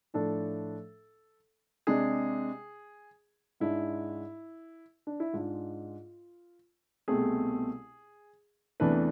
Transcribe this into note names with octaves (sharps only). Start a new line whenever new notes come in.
A2 F3 A3 D4 A4
C3 G#3 D4 G#4
G#2 G#3 D4 E4
D4
E4
G#2 G#3 D4 F4
C2 B2 A3 C4 G#4
E2 C3 E3 A3 D4 B4